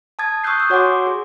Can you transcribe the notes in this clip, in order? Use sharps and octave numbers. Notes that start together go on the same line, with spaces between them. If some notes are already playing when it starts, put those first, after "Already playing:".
A5 D#6 G#6 A6
C#6 D#6 E6 F#6 G6 C7
C#6 E6
F#4 C#5 F#5 G#5 C6 D6
G#4